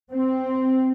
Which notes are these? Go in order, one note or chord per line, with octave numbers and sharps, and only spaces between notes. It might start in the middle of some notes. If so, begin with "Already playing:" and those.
C4